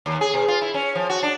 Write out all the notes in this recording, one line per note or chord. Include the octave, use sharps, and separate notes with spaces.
D#2
G#4
B2
F4
E4
C#4
F3
F#4
D4